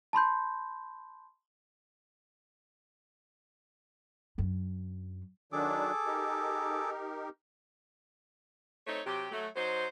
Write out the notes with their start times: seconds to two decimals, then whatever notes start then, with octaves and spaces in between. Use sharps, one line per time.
0.13 A5 B5 C6 G6
4.38 F#2 D4
5.52 D#3 F#3 D4 G#4 A4 D6
6.06 D#4 G4 A#4
8.87 A3 C4 D#4 C#5
9.06 C3 F#3 G4
9.32 F#3 A3
9.56 F#3 D#4 C5